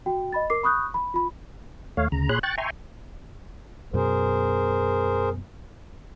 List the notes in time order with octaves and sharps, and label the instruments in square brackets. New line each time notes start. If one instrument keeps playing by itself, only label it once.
[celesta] F#4 G5
D#5 B5 A6
A#4 D6 C7
B5 C#6 D#6 F#6 G6
B5
F4 B5
[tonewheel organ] D#2 A3 C#5 F5
D2 C#3 A#5
A#2 G#4 C#5 B5 C6 F#6
G5 C#6 F#6 A6
E5 G5 G#5 A#5 C6 C#6
[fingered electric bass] F#2 B2 [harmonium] G#4 A#4 C5